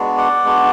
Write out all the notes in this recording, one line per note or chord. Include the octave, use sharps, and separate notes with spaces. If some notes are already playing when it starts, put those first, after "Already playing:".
Already playing: G#3 B3 D4 F#4
D5 F#5
G#3 B3 D4 F#4